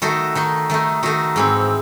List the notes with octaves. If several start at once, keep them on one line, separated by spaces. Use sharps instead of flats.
D#3 A3 D#4 F#4 A4
D#3 A3 D#4
D#3 A3 D#4
D#3 A3 D#4 F#4
G#2 E3 C4